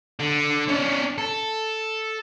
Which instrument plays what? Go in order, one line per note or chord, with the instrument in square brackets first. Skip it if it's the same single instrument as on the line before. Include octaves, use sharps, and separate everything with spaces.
[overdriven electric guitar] D3
C#4 D4
A4